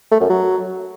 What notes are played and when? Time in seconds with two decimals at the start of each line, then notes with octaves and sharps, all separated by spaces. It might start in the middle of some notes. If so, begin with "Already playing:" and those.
0.11 A3
0.20 F#2
0.29 F#3